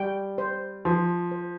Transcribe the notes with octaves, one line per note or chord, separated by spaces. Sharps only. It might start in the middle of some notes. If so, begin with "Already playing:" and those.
Already playing: G3 G5
C5
F3 C6
C5